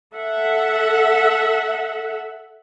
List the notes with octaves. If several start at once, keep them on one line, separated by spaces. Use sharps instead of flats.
A4 E5 F#5